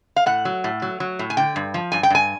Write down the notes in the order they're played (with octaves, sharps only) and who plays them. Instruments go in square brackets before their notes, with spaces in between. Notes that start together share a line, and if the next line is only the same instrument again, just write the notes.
[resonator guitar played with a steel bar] F5
A2 F#5
F#3
A2
F#3
F#3
A2
G#5
D3 G5
G2
F3
G2 G#5
G5
G2 G#5